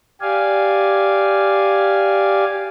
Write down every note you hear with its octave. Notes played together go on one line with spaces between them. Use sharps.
G4 D5 F5 G#5